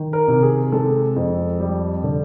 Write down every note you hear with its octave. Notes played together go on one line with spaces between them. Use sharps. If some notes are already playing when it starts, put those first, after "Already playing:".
Already playing: D#3
A#4
C3
G#4
G#3 A4
F2
G3
D3